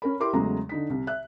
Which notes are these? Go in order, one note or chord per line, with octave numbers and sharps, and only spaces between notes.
C#4 A#4 B5
E4 G4 A#4 C6 D6
E2 C#3 F#3 G#3 A3 A#5
D3 D#4 B6
C2
E5 F#6